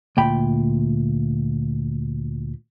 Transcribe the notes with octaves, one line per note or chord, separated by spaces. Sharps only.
D2 A#2 G5 B5